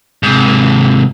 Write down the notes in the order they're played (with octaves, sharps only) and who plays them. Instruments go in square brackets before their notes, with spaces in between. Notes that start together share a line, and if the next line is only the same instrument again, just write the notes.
[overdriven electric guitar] G#2 C3